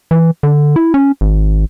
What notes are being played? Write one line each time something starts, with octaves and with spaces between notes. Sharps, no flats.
E3
D3
E4
C#4
G#1